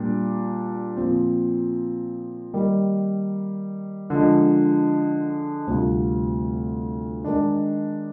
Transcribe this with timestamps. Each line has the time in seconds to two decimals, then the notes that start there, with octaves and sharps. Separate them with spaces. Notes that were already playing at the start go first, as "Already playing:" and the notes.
Already playing: A#2 G3 D4
0.97 A#2 F3 C4
2.54 D#3 G3 A#3
4.10 D3 F3 G#3
5.67 D2 C3 G3 C4 F4
7.24 D#3 G#3 D4